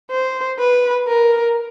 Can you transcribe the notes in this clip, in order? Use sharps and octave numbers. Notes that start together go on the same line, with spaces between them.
C5
B4
A#4